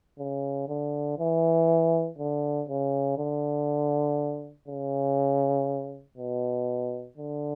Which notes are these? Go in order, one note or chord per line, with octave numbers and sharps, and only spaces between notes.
C#3
D3
E3
D3
C#3
D3
C#3
B2
D3